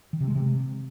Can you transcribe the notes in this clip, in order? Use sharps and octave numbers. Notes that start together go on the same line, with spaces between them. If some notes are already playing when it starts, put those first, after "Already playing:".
D#3
C3
G#3
C3